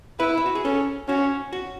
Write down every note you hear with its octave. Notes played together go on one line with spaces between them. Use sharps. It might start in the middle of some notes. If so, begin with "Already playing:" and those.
E4 B4
E4
F#4
G#4
C#4 A4
C#4 F#4
F#4